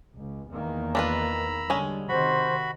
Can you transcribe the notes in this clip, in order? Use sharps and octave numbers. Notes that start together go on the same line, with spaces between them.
C#2
E2 D#3 A#3
D4 F4 B4 A#5 B5 E6
D3 G3 G#3 C#4
C3 D#3 F#4 C5 B5